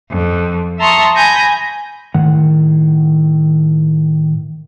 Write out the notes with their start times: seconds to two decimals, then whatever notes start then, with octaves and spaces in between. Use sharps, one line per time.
0.10 F2
0.79 E5 A5 A#5 C6 C#6 D#6
1.15 G#5 B5 G6 A#6
2.14 A2 D#3 F#5